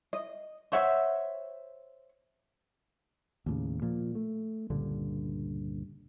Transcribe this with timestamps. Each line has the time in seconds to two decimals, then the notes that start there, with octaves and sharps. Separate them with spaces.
0.13 D#5
0.72 C5 C#5 E5 F#5
3.46 D#2 A2 C#3
3.82 A#2 F3
4.15 A3
4.70 C#2 G2 A#2 D3